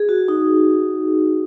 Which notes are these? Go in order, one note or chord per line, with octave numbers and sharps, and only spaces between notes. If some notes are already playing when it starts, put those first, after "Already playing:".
Already playing: G#4
F#4
D#4